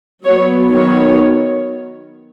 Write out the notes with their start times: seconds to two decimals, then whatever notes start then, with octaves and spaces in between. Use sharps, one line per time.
0.24 F#3 B3 C#5
0.71 D#3 F#3 B3 C#5